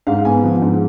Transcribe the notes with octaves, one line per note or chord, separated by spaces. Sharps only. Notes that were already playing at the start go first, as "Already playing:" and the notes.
G#2 F5
B3 G#5
F3
G#2